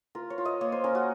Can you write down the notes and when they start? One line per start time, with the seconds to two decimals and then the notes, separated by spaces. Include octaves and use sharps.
0.15 F4 A#4
0.30 C#5
0.38 F4
0.45 D#5
0.61 A#3 C#5
0.72 C5
0.84 C#4 A#4
0.95 F#4